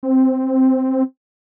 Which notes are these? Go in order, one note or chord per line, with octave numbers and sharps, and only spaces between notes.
C4